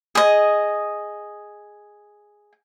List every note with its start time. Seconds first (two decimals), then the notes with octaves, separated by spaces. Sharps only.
0.15 G#4 D#5